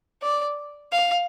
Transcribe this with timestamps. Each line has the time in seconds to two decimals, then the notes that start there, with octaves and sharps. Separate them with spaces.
0.22 D5
0.92 F5